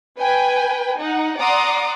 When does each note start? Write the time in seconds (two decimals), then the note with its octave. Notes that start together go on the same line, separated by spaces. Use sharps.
0.19 B4 G5 G#5
0.98 D#4 F#5
1.40 D5 F#5 A#5 C6 D6 D#6